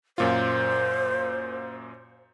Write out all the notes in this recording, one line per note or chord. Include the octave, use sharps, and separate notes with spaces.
F#2 A#2 F4 C5